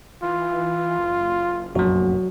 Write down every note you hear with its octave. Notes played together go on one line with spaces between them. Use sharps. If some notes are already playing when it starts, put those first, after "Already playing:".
E3 F4
F#1
F1 A#1 F#2 F#3 F#4